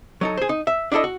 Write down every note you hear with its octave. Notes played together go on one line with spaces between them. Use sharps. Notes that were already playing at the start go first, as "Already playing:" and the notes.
F#3 D#4 A4
G#4 C5
D#4
E5
D4 E4 F#4 A4 D#5
F#4